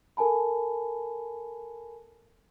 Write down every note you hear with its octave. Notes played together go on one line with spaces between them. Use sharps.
A4 A#4 G#5 A5 B5